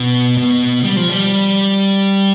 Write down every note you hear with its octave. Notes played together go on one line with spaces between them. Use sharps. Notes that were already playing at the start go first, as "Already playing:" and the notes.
Already playing: B2
B2
G3
F3
G3